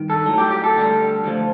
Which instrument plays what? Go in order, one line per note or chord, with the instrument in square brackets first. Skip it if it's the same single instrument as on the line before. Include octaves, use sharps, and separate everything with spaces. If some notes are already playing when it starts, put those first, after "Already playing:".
Already playing: [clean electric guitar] G2 D#3
A4
A2 F#3
G4
G4
A4
D2 D3 G3
D2 D3 F3